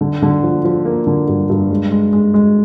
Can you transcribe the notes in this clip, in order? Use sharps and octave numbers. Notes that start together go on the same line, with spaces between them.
D3
D3
F3
F3
A#3
D3
G2
G2
G#3
G#3
G#3
G#3